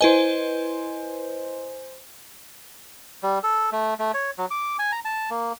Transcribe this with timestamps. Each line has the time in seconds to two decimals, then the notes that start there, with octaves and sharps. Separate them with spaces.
0.01 E4 B4 C5 D#5 G#5
3.23 G3
3.43 A4
3.72 A3
3.99 A3
4.14 C#5
4.38 F#3
4.51 D6
4.79 G#5
4.92 A#5
5.05 A5
5.30 A#3